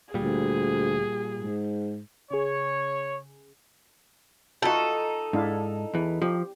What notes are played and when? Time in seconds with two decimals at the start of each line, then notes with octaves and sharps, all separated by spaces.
0.14 D2 A#2 G3 G#4
1.36 G#2
2.30 C#3 G#4 C#5
4.62 D#4 F4 F#4 A4 E5
5.33 G#2 D4 E4 F5
5.94 E2 E3
6.22 F3 G4